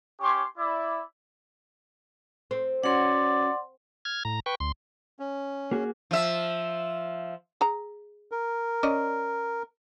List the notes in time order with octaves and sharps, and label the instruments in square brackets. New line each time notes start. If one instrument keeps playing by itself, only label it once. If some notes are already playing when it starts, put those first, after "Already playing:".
[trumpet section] C#4 G4 C#5 C6 D6
E4 D5
[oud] C4
[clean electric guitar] C#4 F#4 [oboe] D5 [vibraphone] F#5 C6
[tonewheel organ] F6 G#6
A2 A#5
B4 G5 C#6
D2 C6
[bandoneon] C#4
[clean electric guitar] A#3 F#4 G#4
[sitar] F3 E5
[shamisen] G#4 A#5
[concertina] A#4
[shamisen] C#4 D5 D#5